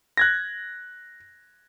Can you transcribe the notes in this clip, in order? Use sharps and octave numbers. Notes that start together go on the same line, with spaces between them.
F#6 G#6 A#6